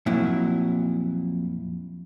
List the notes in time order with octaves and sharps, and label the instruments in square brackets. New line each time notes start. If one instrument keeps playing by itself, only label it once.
[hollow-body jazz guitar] F2 A#2 F#3 E4